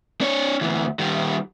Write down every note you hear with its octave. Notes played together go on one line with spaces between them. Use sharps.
D4 C#5
D2 E3
D#3 G3